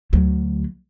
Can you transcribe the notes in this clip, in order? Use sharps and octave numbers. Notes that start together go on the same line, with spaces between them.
D2 F#3